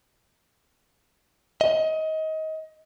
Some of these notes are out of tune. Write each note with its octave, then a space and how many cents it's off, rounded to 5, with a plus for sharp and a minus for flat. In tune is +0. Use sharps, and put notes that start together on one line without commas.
D#5 +25